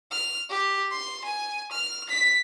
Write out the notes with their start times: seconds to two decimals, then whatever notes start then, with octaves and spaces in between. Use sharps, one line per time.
0.12 F6
0.50 G4
0.92 C6
1.25 G#5
1.72 F6
2.09 B6